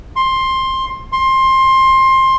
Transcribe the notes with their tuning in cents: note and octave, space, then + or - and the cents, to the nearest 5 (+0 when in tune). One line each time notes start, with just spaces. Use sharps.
C6 +15
C6 +20